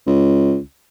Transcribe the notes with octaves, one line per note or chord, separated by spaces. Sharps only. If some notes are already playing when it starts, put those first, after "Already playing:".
C#2